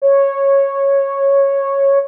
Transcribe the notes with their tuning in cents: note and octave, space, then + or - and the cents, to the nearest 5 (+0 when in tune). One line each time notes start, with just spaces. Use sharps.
C#5 -10